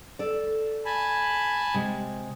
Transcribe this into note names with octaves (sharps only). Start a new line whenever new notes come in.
A4 D5
G#5 A5 B5
C3 G#3